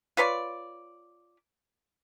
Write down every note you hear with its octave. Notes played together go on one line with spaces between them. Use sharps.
F4 B4 C#5 D5